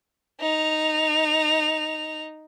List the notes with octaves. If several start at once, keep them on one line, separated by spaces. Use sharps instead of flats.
D#4 F7